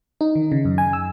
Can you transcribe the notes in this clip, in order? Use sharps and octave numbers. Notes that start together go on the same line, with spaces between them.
D#4
D#3
C#3
F#2
G#5
E6